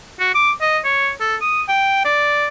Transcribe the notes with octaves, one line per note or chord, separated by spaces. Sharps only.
F#4
D6
D#5
C#5
A4
D#6
G5
D5